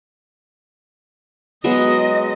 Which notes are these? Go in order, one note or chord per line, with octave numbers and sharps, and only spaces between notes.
F#3 G#3 B3 D#5